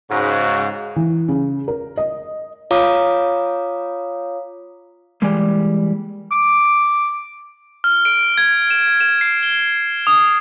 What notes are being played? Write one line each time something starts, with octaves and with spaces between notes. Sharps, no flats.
G#2 C#3 F#4
E3
C#3
A#4
D#5
F4 C#5 F5 A#5 D6 D#6
E3 G3 G#3 A#3
D6
F6
D7
G#6
E7
E7
C7
G7
D#6